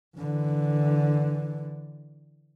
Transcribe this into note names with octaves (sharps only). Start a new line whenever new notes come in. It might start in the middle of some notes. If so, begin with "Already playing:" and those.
D3 E3